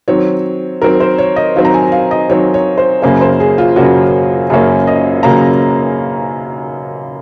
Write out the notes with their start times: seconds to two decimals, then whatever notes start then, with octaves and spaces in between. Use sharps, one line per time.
0.08 D#3 F#3 C4 C#5
0.82 D#3 F#3 C4 A#4
1.00 C5
1.18 C#5
1.36 D#5
1.56 D#3 F#3 C4 F5
1.65 A#5
1.74 G#5
1.92 F5
2.11 D#5
2.30 D#3 F#3 C4 C#5
2.54 C#5
2.78 C5
3.02 F#2 C#3 F#3 A#3 C#4 C5
3.21 C5
3.40 G#4
3.58 F4
3.76 F#2 C#3 F#3 A#3 C#4 F#4
4.50 F#2 C#3 F#3 A#3 C#4 G#4
4.87 D#5
5.23 C#3 F#3 A#3 C#4 A#5